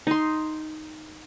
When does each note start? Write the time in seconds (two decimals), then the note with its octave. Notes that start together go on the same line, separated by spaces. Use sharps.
0.07 D#4 C6